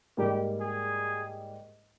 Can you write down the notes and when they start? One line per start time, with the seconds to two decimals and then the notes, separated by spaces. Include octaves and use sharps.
0.17 G#2 G3 A#3 G4
0.61 G#4